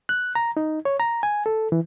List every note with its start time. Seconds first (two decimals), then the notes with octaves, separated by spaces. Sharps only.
0.09 F#6
0.35 A#5
0.57 D#4
0.85 C#5
1.00 A#5
1.23 G#5
1.46 A4
1.72 E3